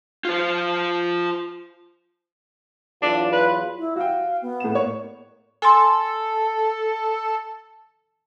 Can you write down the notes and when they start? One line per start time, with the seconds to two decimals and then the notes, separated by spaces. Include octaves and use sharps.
0.25 F4 C5
3.02 E2 F#3 D4 F4
3.32 B4
3.78 E4
3.96 F#4 F5 G5
4.41 B3
4.60 A2 E7
4.75 A#3 C#5 C#6
5.62 A4 G#5 C6